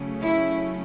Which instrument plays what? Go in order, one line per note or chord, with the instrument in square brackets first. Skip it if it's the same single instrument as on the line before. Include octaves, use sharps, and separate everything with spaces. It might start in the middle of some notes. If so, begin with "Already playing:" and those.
Already playing: [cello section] C#3 F#3 A3 C#4
E4